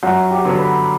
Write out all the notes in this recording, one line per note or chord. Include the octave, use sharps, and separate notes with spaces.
F#2 F#4
G4
D3 F#3 B3
B4